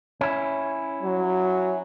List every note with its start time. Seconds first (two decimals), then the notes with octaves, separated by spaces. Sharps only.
0.21 C#4 E4
1.02 F#3